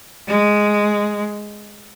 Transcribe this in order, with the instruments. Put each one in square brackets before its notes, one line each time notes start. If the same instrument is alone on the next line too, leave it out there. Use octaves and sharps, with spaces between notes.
[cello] G#3